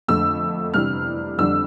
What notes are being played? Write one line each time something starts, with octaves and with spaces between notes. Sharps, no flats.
F2 D3 A3 E6
C3 E3 G3 D4 F6
F2 D3 G3 D4 E6